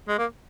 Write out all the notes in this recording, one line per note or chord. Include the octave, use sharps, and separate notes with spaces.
G#3
A#3